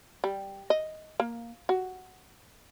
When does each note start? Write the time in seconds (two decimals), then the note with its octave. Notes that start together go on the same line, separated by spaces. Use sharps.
0.24 G3
0.70 D#5
1.20 A#3
1.69 F#4